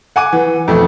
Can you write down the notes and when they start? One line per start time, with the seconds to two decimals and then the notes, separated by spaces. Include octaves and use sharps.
0.16 F#5 G#5 D6 D#7
0.33 E3
0.68 F2 B2 A3 E4